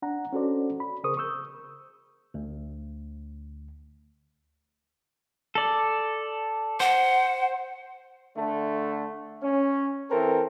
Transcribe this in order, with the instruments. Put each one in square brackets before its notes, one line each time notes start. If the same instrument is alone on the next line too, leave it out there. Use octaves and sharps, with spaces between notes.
[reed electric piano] D4 F#5 A#5
C#4 D4 F#4 A4 C5 D5
B5
C#3 G#4 A#4 C5 C#6 D#6
C#6 D#6 E6 G6
[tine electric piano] D2
[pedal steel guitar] A4 D5
[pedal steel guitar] C5 [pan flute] F#5
[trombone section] D3 A3
C#4
E3 C4 A4 A#4